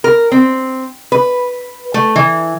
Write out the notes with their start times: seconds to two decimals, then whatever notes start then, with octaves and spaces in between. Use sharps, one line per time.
0.04 A#4
0.32 C4
1.12 B4
1.94 A3
2.16 E3